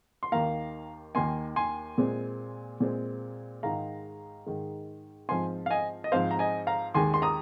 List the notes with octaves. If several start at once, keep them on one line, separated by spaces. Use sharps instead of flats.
C6
D#2 D#3 A#3 F5 A#5
D#2 D#3 A#3 G#5 C6
G#5 C6
A#2 G#3 C4
A#2 G#3 C4
G#2 D#3 G#3 F5 A#5
G#2 D#3 G#3
G#2 F3 C4 G#5 C6
F5
D#5 G#5
D#5
G#2 F3 C4 C5 F5
A#5
D#5 G#5
F5 A#5
D#2 D#3 G#3 G#5 C6
C6
A#5 D#6